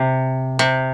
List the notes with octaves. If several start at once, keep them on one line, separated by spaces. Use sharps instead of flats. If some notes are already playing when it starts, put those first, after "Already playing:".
Already playing: C3
C3